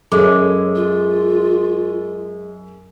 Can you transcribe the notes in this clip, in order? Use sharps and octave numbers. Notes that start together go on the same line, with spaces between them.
F#2 G#3 A4 C#5 D6
F4